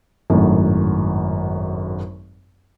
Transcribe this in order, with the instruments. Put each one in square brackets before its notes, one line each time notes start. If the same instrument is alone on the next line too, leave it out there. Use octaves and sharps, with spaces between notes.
[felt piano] G#1 F#2 A2